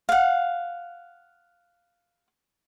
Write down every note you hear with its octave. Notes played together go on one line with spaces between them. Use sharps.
F5 F#5